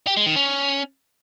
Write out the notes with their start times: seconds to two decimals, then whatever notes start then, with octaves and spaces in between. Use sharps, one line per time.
0.07 G4
0.17 G#3
0.26 D#3
0.36 C#4